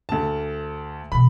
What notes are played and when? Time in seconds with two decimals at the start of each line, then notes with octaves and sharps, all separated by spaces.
0.09 D2 A5
1.12 B2 E3 B5